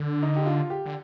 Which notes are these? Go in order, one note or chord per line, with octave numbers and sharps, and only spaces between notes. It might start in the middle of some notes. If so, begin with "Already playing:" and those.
Already playing: D3
D#4
G4
F4
G4
D3